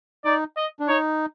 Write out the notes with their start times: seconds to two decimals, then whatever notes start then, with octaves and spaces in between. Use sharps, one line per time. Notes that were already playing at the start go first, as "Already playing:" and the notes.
0.25 D#4 D5
0.57 D#5
0.80 D4
0.88 D#4 C#5